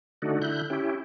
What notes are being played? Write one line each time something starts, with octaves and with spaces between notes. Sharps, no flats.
D3 A3 D4 D#4 F#4
D3 E4 F#6 G6
C#4 E4 G4